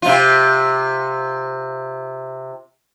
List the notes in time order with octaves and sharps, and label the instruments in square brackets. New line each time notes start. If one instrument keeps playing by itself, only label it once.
[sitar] C3 F4